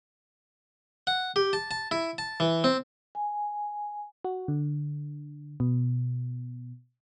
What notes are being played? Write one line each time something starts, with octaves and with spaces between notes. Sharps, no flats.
F#5
G4
A5
A5
E4
A5
E3
C4
G#5
F#4
D3
B2